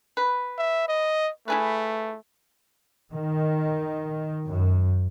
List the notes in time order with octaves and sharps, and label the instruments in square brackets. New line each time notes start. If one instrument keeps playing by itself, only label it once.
[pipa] B4
[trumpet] E5
D#5
[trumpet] A3 [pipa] E4 G#4 B4
[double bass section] D#3
F#2